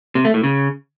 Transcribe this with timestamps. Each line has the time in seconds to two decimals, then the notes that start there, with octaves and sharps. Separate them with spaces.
0.15 C3
0.25 A3
0.34 A2
0.44 C#3